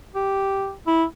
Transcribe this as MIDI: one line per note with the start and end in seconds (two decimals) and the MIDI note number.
0.15 0.72 67
0.87 1.04 64